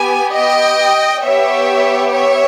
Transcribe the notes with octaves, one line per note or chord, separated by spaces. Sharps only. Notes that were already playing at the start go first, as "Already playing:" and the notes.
Already playing: B3 G4 G#5
D#5 G5
B3 G4 C#5 E5
C#5 E5